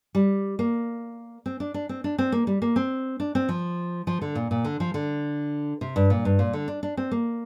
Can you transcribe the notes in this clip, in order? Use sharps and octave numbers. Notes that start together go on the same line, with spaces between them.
G3
A#3
C4
D4
D4
C4
D4
C4
A#3
G3
A#3
C4
D4
C4
F3
F3
D3
A#2
A#2
D3
F3
D3
C3
G2
A#2
G2
A#2
D3
D4
D4
C4
A#3